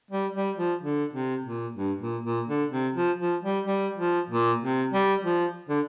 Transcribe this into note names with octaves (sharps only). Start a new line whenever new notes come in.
G3
G3
F3
D3
C3
A#2
G2
A#2
A#2
D3
C3
F3
F3
G3
G3
F3
A#2
C3
G3
F3
D3